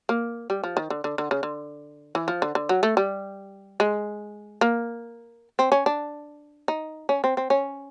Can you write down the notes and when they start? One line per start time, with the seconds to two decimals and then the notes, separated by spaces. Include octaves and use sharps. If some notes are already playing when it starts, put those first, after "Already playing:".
0.09 A#3
0.50 G3
0.64 F3
0.77 D#3
0.90 D3
1.04 D3
1.18 D3
1.31 C#3
1.43 D3
2.15 E3
2.28 F3
2.42 D3
2.55 D3
2.69 F#3
2.83 A3
2.97 G3
3.80 G#3
4.61 A#3
5.59 C4
5.72 C#4
5.86 D4
6.68 D#4
7.09 C#4
7.24 C4
7.37 C4
7.50 C#4